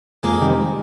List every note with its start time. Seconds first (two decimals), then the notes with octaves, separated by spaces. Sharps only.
0.23 F2 G#3 A#3
0.41 C3 D#3 G3